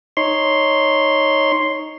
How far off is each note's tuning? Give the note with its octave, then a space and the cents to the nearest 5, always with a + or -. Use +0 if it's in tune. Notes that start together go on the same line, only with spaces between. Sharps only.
D#4 +0 C#5 -5 C6 +0